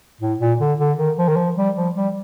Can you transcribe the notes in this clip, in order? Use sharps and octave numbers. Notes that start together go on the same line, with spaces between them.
A2
A#2
D3
D3
D#3
F3
D#3
F3
G3
F3
G3